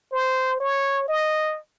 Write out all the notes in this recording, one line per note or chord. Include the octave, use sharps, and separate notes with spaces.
C5
C#5
D#5